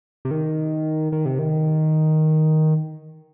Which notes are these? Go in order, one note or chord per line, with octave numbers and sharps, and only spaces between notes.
C3
D#3
D#3
C3
D#3